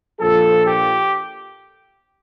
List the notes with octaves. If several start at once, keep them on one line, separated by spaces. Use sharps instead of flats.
A#1 A#2 F3 A4
G4